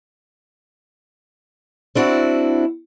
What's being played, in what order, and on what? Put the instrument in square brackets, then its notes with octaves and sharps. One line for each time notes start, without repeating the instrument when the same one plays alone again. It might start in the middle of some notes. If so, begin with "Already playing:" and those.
[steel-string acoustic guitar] C4 D4 E4 F#4